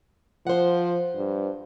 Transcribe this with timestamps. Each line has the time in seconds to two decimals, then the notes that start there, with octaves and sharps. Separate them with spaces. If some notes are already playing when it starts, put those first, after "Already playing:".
0.47 F3 C5 F#5
1.16 G2